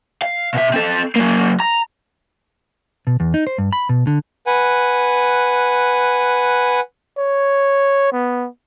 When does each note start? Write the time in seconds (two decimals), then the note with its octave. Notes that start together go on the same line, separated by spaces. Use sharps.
0.22 F5
0.54 B2 E5
0.74 C4 A4
1.16 F#3 A#3
1.60 A#5
3.07 B2
3.20 E2
3.34 D#4
3.47 C5
3.58 G2
3.73 B5
3.89 B2
4.07 D3
4.47 B4 F#5 G#5
7.18 C#5
8.13 B3